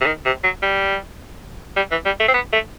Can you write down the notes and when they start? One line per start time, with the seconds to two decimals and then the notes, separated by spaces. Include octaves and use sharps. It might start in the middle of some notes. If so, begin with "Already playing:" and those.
0.01 C3
0.06 D#3
0.25 C3
0.44 F#3
0.62 G3
1.76 G3
1.91 E3
2.06 G3
2.20 A3
2.28 C4
2.34 B3
2.53 A3